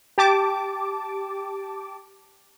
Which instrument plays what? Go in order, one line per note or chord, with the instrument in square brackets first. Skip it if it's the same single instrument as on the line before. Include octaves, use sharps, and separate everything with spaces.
[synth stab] G4 A5 D6